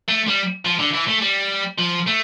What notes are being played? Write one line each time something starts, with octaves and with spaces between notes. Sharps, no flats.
A3
G3
F3
D3
E3
A3
G3
F3
A3